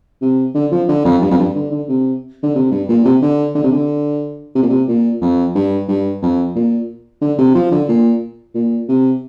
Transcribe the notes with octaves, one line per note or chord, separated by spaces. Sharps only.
C3
D3
F3
D3
F2
G2
F2
G2
D3
D3
C3
D3
C3
G2
A#2
C3
D3
D3
C3
D3
C3
A#2
C3
A#2
F2
G2
G2
F2
A#2
D3
C3
F3
D3
A#2
A#2
C3